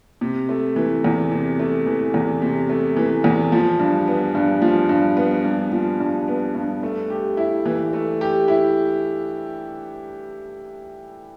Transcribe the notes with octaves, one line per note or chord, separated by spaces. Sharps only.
C3
A3
E3
E2
C3
A3
E3
E2
C3
A3
E3
E2
F3
G2
B3
G2
F3
G2
B3
G2
F3
G2
B3
G2
A3
G4
E4
E3
A3
G4
E4